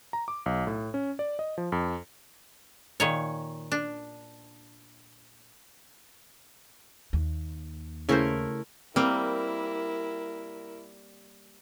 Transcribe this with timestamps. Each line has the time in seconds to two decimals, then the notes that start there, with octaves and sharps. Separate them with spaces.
0.13 A#5
0.28 D6
0.46 B1
0.67 A2
0.94 C#4
1.19 D5
1.39 D#5
1.58 F3
1.72 F2
3.00 A#2 D#3 C#5
3.72 D4
7.13 D#2
8.09 C#3 A3 C#4 E4 A#4 C5
8.96 G3 A#3 C4 E4 A#4